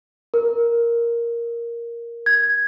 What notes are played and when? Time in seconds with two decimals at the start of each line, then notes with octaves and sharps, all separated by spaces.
0.34 A#4
2.26 G#6